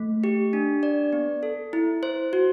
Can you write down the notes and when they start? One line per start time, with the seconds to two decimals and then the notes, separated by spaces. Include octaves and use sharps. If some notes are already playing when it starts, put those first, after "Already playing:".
Already playing: A3
0.24 G4
0.53 D4
0.83 D5
1.13 B3
1.43 A4
1.73 E4
2.03 C5
2.33 F#4